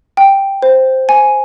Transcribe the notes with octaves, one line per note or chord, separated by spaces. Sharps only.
G5
C5
G#5